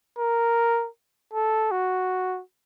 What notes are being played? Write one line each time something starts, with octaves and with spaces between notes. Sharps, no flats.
A#4
A4
F#4